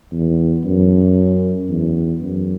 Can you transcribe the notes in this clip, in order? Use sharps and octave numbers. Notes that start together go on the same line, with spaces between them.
E2
F#2
E2
F#2